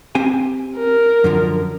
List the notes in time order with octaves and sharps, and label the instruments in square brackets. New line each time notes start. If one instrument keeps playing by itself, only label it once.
[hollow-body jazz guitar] C4 G4 G#5
[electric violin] A#4
[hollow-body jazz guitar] F#2 D3 F3